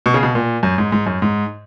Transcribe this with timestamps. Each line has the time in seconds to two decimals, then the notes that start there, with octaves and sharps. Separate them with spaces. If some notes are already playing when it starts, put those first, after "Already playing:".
0.06 B2
0.14 C#3
0.23 B2
0.35 A#2
0.63 F#2
0.78 G#2
0.92 G#2
1.06 F#2
1.22 G#2